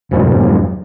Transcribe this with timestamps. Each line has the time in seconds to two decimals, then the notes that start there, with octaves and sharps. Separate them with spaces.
0.11 B1 F2 G#2 F#3